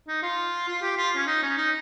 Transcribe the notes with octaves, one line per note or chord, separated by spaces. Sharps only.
D#4
F4
F4
G4
F4
C#4
D#4
C#4
D#4